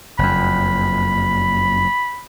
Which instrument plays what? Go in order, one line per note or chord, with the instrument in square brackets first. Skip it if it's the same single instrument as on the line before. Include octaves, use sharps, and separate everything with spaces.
[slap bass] F#1 F2 [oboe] B5